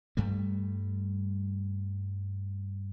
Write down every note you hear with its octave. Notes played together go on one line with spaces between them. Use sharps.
G2 G3 A3